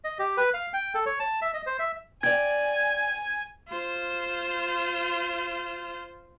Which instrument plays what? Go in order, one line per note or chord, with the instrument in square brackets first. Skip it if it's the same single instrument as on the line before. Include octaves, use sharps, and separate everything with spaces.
[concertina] D#5
G4
B4
F5
G5
A4
C#5
A5
E5
D#5
C5
E5
[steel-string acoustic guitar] D5 G5 [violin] G#5 [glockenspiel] G#6
[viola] F4 C5